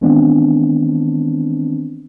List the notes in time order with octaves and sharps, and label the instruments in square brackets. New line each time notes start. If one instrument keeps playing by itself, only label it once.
[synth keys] D#3 E3 G#3 B3 C4 D4